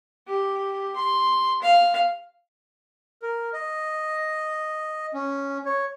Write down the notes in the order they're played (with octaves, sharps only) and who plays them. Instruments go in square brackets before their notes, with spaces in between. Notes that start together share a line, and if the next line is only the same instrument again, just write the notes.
[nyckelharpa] G4
C6
F5
[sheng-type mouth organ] A#4
D#5
C#4
C#5